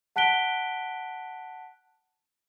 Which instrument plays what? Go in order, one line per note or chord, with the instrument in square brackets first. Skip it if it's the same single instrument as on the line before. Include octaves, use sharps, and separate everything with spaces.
[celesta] F#5 A5 F#6 B6 D7 G7